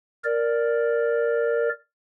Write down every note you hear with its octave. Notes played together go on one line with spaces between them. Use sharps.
A#4 D5